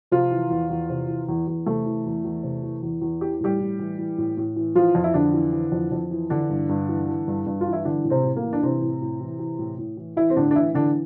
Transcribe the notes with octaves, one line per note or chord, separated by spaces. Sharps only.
C3 F3 F4
E3
E2
E2
C3
E3
E2
E2
C3 A3
E3
E2
E2
C3
E3
E2
E2
E3 G4
A2 G3 G4
A2
E3
E3
A2
A2
E3
E3 F3 F4
F2
E4
F2 D3 D4
E3
E3
F2
F2
E3
D3 E3 D4
G2
G2
E3
E3
G2
G2
F4
E3
E4
D3 E3 D4
A2
C3 C4
A2
A#3
E3
D4
C3 E3 C4
A2
A2
E3
E3
A2
A2
E3
E3 E4
C4
A2 D3 D4
D4
A2 E3 E4
D3 E3 D4